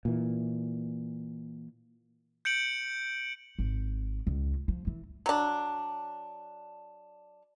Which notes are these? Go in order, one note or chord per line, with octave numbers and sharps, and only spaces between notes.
A#2 E3
G6 C#7 D7 F#7
G#1
C#2
F3
E3
F#3 D4